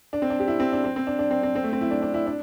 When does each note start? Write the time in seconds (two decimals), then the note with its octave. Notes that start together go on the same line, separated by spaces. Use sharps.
0.13 D4
0.22 C4
0.30 D4
0.40 G4
0.48 E4
0.60 C4
0.72 D4
0.84 C4
0.96 C4
1.07 D4
1.19 D4
1.31 C4
1.43 C4
1.55 C4
1.63 A3
1.73 C4
1.81 E4
1.91 D4
2.02 D4
2.14 E4
2.27 D4